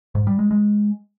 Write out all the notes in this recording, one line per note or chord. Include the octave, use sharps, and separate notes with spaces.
G#2
G3
G#3
G#3